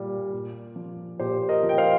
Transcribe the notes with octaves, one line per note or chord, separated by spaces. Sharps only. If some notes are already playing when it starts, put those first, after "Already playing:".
Already playing: A#2 G3
A#2
F3
A#2 G4 C5
A#4 D#5
F3
G5
C5 F5